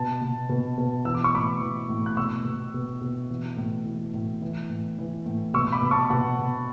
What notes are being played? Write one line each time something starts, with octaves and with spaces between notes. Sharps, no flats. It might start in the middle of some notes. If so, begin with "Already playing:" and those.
Already playing: B2 A5
B2
B2
B2
E3 E6
D6
C#6
A2 B5 D6
E3
A2
F#6
B2 C#6 E6
B2
B2
B2
E3
A2
E3
A2
E3
A2
E3
A2
B2 C#6 E6
B5 D6
B2
A5 C#6
B2 F#5 A5
B2